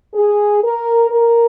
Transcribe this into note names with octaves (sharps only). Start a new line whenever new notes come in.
G#4
A#4
A#4